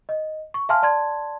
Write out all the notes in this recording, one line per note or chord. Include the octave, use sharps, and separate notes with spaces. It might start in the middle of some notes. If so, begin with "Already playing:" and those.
D#5
C#6
E5 F5 G#5 A5 C6 F6
D5 A5 C6 G#6